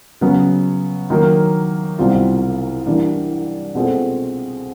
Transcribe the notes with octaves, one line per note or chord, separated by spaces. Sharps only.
C#3 F#3 B3
D#3 F#3 A#3
C2 B2 G3 C4 F4
E3 G3 A#3 D4
B2 G#3 C4 F4 A4